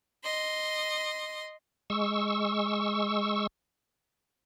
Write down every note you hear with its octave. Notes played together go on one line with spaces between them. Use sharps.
D#5 C6
G#3 C#6 E6